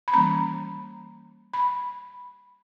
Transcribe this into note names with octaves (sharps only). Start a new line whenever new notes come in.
B5
E3 G3 A#3 C#4 A#5
B5